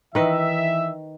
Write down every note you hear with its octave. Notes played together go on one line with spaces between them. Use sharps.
D#3 E3 B4 D#5 E5